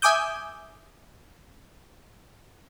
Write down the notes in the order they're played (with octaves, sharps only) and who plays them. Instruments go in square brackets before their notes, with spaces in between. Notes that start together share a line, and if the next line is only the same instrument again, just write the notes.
[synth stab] E5 G#5 D6 D#6 G6